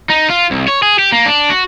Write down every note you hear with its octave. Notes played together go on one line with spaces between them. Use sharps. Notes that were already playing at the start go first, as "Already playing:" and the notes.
D#4
F4
C2
C#5
G#4
G4
A#3
D4
F#4